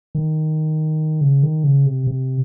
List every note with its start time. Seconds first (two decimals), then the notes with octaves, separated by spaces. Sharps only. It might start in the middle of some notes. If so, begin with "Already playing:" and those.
0.15 D#3
1.21 C#3
1.43 D#3
1.64 C#3
1.86 C3
2.07 C3